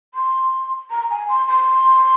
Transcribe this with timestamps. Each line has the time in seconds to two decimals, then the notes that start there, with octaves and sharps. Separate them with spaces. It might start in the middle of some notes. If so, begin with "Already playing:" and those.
0.14 C6
0.91 A#5
1.10 G#5
1.29 C6
1.48 C6